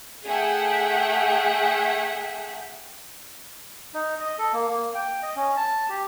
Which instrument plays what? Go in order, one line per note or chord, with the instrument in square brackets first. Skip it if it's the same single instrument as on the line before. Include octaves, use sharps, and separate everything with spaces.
[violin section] A3 G#4 E5 F#5 G5
[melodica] D#4
D#5
A4
A#3
A#3
G5
D#5
C#4
A5
G4